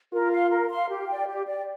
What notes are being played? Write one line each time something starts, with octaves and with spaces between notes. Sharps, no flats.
F4 A#4
F5 C6
A#4
F5 C6
G4
D5 G5
G4
D5 G5